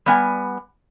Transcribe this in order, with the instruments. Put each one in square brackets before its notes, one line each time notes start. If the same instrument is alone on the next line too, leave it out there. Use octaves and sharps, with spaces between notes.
[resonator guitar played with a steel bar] G3 B3 G#5